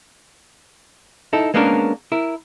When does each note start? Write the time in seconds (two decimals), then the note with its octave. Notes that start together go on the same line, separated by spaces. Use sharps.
1.33 D#4 E4 A4
1.54 G#3 A#3 B3 C#4 D4 A#4
2.12 E4 A#4